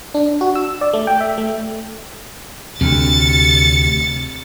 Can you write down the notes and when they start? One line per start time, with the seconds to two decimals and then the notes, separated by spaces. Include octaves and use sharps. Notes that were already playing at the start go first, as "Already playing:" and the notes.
0.14 D4
0.41 F#4
0.55 E6
0.81 D5
0.93 A3
1.07 G5
1.21 E5
1.38 A3
2.81 D2 C3 A6 C#7